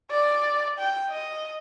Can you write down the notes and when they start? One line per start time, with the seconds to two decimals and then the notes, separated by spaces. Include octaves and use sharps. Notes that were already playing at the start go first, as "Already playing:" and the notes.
0.11 D5
0.79 G5
1.10 D#5